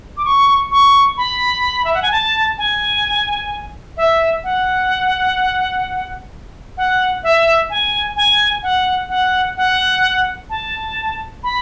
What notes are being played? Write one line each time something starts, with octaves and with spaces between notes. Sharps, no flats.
D6
C#6
C#6
B5
E5
F#5
G#5
A5
G#5
E5
F#5
F#5
E5
G#5
G#5
F#5
F#5
F#5
A5
B5